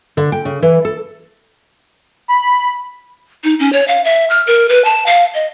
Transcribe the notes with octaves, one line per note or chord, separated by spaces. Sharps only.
D3
G5
C#3
E3
A4
B5
D#4
C#4
C#5
F5
E5
F6
A#4
B4
A5
F5
D#5